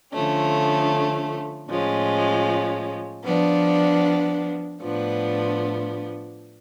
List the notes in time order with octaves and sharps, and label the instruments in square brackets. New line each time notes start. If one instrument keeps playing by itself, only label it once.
[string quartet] D3 F3 A3 C#4
A2 F3 G#3 C#4
F3 B3 D4
A2 F3 B3 D4